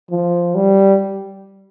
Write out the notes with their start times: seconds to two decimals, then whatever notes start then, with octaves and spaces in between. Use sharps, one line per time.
0.11 F3
0.55 G3